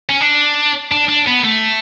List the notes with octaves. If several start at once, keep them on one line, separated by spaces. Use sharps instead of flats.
C#4
D4
D4
D4
B3
A3